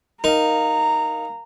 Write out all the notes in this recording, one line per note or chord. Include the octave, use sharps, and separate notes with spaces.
D#4 A#4 F5 A#5